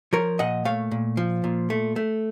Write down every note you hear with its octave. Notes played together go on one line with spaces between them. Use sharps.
F3 A#4 C#5
A#2 D#5 F#5
A3 C#5 F5
A#2
F3
A#2
A3
A3